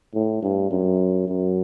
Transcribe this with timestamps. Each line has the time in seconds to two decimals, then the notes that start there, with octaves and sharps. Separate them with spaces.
0.14 A2
0.42 G2
0.71 F#2
1.27 F#2